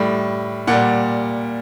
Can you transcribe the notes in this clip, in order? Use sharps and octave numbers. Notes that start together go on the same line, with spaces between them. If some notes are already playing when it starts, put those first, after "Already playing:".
Already playing: A2 G3
A#2 G3 F#5